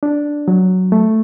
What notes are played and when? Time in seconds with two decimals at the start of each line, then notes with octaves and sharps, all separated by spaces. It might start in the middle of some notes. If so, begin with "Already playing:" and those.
0.03 D4
0.48 F#3
0.92 A3